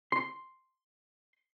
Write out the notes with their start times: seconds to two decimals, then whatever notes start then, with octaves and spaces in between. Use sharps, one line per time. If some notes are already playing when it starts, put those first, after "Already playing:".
0.12 C6